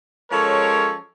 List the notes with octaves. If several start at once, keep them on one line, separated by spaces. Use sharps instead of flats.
F3 G#3 C#4 A4 A#4 C#5